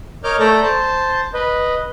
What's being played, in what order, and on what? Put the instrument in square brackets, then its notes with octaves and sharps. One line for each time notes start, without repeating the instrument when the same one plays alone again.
[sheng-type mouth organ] A#4 C#5 D#5 D6 F6 G6
A3 A4 D5 A#5 G6
C5 A5
B4 D#5